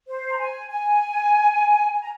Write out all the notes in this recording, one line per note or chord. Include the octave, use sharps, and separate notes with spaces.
C5
A#5
G#5
G#5
G#5
A#5